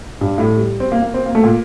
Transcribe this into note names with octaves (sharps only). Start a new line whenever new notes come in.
G2
A2
G3
C4
A#3
A#3
C4
A#3
A3
A#2